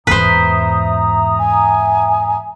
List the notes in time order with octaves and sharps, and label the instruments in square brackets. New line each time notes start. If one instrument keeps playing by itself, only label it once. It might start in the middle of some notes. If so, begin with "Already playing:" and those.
[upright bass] E2 G#2 [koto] B4 C5 [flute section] E5 A#5 D#6
[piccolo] G#5